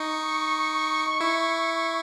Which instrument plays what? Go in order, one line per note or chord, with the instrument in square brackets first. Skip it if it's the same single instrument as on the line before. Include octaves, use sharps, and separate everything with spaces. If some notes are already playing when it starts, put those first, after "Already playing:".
Already playing: [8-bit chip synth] D#4 [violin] C#6
[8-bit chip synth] E4